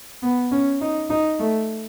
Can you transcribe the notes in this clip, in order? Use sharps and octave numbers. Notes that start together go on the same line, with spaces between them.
B3
C#4
D#4
D#4
A3